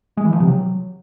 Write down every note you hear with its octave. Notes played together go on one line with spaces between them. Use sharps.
G#3
E3
F3
C3
F#3